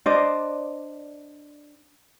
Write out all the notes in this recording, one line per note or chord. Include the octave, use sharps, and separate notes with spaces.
D4 C5 D5 D#5